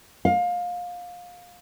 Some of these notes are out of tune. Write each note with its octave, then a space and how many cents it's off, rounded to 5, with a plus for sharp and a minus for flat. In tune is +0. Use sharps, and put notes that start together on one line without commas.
F5 +25